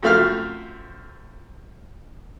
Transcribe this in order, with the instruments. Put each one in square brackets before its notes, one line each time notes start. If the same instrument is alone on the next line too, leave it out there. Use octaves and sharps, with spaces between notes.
[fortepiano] F#2 F3 A3 C4 F5 F6